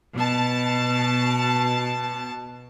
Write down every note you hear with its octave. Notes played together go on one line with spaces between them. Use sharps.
B2 A5